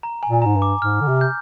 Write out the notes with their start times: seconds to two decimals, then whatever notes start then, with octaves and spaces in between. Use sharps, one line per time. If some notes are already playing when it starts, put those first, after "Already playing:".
0.03 A#5
0.23 G#5
0.29 A#2
0.42 G#2 A#5
0.56 G2
0.62 D6
0.81 G#2 F6
1.01 D3
1.08 C3
1.21 G6